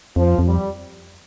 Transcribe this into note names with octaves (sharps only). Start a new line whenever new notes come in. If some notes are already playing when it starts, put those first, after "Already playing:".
F2 F3
F2
G3